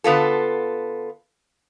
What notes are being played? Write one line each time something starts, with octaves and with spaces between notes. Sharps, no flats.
D3 B3 F4 A4